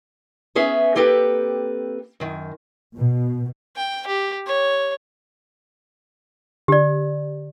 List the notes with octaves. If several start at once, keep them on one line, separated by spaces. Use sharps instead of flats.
B3 C#4 G#4 E5
A#3 C4 G4 A4 B4
F#2 D#3
B2
G5
G4
C#5
D3 G4 D5